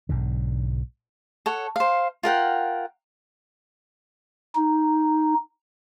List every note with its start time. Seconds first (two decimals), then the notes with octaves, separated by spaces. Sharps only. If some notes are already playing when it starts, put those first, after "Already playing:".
0.09 B1 G#2 D3
1.46 A4 C#5 F#5
1.76 C5 F5
2.23 F4 A#4 F#5 G5
4.55 D#4